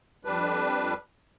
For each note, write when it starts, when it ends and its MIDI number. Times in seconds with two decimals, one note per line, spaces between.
0.25 0.94 41
0.25 0.94 55
0.25 0.94 62
0.25 0.94 71